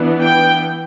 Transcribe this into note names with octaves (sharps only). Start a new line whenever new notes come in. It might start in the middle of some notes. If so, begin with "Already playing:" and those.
Already playing: E3 B3 D4
G5